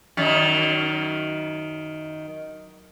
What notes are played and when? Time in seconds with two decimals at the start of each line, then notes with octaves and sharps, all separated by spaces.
0.17 F#2 D#3